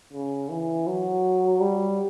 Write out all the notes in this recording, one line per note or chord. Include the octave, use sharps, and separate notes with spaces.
C#3
E3
F#3
G3